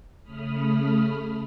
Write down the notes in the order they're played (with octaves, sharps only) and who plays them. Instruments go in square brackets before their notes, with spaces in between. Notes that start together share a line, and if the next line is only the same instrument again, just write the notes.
[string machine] C#3 A3 B5 D#6 F6